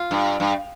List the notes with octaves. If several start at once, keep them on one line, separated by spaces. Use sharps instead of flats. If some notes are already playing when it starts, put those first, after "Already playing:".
Already playing: F4
G2
G2